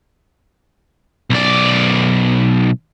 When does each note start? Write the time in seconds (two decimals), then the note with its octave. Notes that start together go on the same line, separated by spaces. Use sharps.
1.30 B1 D5